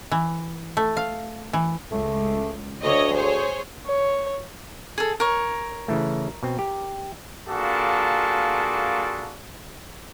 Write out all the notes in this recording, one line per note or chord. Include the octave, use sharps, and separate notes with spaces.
E3
A3
F5
E3
C#2 A3
D2 D3 C#5 D#5
G#4 C5 C#5
C#5
G#4 A4
A#4 C#5
C#3 E3 A3
B2 C4
G4
A#3 D4 F4 F#4 G#4 A4